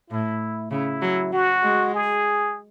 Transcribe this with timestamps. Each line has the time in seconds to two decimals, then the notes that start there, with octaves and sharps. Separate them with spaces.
0.10 A2 E4
0.71 C#3 E4
1.02 F#3
1.32 F#3 F#4
1.63 G#3
1.94 G#4